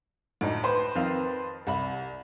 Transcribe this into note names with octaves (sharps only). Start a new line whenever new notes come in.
D2 A2 D#4
B4 C5 C6
F2 D#3 F5
C2 E5 B5